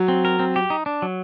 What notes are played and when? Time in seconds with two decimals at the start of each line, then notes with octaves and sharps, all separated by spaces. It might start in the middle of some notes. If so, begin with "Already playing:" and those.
Already playing: F#3
0.08 C4
0.25 A#4
0.39 C4
0.56 G4
0.70 D#4
0.86 D4
1.02 F#3